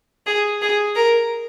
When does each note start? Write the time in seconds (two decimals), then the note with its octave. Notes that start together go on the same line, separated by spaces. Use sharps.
0.26 G#4
0.62 G#4
0.96 A#4